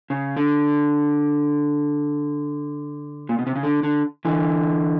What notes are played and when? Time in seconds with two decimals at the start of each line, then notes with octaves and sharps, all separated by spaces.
0.10 C#3
0.37 D3
3.29 A#2
3.39 B2
3.47 C3
3.56 C#3
3.63 D3
3.83 D3
4.25 D3 E3